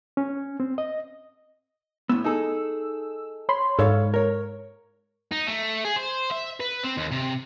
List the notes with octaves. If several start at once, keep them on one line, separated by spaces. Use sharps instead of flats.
C#4
C4
D#5
A2 B3 E6
D#4 G#4 A4
C#5 B5 C6
G#2 A4 C#5 F5
A#4 C#5
D#4
A3
G#4
C5
E5
B4
C4
D#2
C3